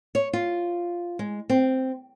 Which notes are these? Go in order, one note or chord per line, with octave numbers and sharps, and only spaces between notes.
C#5
F4
G#3
C4